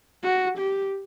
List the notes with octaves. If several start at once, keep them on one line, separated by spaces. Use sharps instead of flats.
F#4
G4